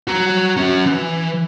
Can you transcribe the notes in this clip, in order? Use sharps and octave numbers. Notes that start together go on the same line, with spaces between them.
F#4 A#5
C#4 F#4
E3